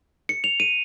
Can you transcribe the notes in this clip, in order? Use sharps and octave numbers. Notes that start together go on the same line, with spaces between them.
C#7
F7
D#7